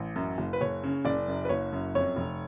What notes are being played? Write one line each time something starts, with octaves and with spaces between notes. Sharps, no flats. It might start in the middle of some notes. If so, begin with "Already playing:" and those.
Already playing: A1
F#2
F#1
B4
F#1 C#5
C#3
F#1 D5
F#2
B4
F#1 C#5
F#2
F2 C#5
F1